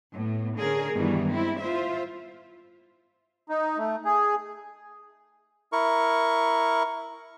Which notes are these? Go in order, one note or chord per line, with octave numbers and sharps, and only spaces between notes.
A2 B3
D3 C#4 G#4 A#4
G2 B2 D#3 E3 G3
G#3 C4 E4
F4 C5 E5
D#4
A3
G#4
E4 A#4 C#6